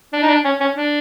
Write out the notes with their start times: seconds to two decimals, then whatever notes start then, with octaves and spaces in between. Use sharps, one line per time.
0.13 D4
0.23 D#4
0.28 D4
0.45 C#4
0.60 C#4
0.75 D4